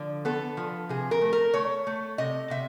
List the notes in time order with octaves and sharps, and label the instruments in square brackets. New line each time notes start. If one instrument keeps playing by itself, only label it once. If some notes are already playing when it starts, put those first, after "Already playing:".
Already playing: [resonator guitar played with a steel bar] D3 F3
B3 A4
F3
C3 G#4
A#4
A3
A#4
A3 C#5
A3
C3 D#5
C3 E5